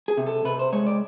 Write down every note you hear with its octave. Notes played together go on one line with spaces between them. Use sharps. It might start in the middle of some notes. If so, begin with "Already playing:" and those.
G#4
C3
A4
C3 B4
C5
G#3 C#5
D5